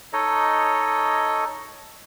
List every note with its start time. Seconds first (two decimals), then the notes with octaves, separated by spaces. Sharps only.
0.13 D#4 A4 C#5 D#5